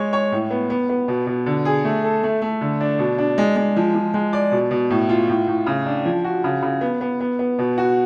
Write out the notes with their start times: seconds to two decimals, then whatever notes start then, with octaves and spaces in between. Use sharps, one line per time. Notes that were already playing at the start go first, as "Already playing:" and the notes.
Already playing: G#3 C#5
0.13 C#5
0.32 A2
0.50 B3
0.70 B3
0.89 B3
1.08 B2
1.27 B2
1.46 D3
1.65 G#4
1.85 A3
2.04 A4
2.23 A3
2.42 A3
2.61 D3
2.81 D4
2.99 B2
3.18 D4
3.38 G#3
3.56 G#3
3.76 F3
3.94 F3
4.14 G#3
4.33 D5
4.52 B2
4.71 B2
4.90 A2
5.09 F4
5.29 A2
5.48 A2
5.66 C#3
5.86 D4
6.06 F3
6.24 F#4
6.44 C#3
6.62 C#3
6.81 B3
7.01 B3
7.20 B3
7.39 B3
7.59 B2
7.78 F#4